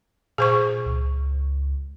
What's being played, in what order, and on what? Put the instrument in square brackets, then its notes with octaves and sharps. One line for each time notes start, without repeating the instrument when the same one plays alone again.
[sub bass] A#2 [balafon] G#4 C5 C#6
[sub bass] C#2